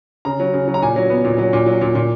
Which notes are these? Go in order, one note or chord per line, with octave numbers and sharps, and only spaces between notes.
C#3 A#5
F#3
C#3
F#3
A#5
A#2 G#5
F#3
B3
A#2
F#3
A#2
F#3
A#2
A#2